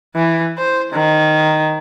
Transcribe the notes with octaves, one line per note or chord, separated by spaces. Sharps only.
E3
C5
D#3